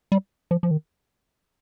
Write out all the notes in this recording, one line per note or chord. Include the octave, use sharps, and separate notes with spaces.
G3
F3
F3
D#3